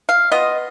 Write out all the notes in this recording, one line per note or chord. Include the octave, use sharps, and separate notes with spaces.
F5
B3 F4 D#5